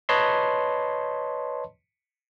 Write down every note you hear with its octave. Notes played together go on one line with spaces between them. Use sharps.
B4 C#5 D#5 A5 B5 C6